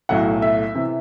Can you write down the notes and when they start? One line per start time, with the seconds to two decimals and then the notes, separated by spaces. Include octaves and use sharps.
0.09 B1 A2 F#3 F#5
0.42 E5
0.75 C3 E3